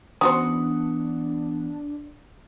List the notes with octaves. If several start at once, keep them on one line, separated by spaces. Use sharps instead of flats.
E3 B3 C#4 D4 F#4 C5 F#5 D#6